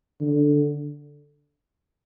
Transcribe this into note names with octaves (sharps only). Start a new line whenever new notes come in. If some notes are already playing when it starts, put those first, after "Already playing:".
D3